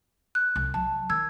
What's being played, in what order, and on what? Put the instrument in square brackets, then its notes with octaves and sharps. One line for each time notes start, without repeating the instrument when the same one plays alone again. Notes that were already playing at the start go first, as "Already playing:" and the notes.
[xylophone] F#6
[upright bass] C2
[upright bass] F#3 [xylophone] A5
[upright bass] D#3 [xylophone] E6 G#6